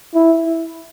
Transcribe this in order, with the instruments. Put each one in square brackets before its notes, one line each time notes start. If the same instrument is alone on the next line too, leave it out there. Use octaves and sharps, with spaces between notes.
[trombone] E4